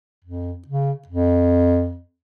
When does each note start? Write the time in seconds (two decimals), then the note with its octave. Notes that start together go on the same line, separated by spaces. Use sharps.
0.25 F2
0.68 C#3
1.08 F2